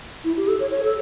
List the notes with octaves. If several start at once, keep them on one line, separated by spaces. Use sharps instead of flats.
E4
G4
A4
C#5
C#5
A4